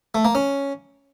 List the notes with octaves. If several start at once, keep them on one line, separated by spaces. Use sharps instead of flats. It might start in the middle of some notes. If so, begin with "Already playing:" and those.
A3
A#3
C#4